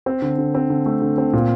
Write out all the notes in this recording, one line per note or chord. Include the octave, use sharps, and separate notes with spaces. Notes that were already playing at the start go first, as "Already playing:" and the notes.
C4
D3
D3
C4
D3
A3
D3
C4
A#2